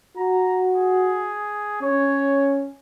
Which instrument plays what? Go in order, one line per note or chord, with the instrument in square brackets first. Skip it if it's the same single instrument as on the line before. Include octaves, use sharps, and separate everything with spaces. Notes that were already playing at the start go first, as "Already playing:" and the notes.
[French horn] F#4 [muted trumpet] A#5
[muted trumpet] G#4
[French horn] C#4 [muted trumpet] C#5